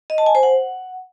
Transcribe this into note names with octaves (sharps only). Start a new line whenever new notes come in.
D#5
A5
G#5
C5
F#5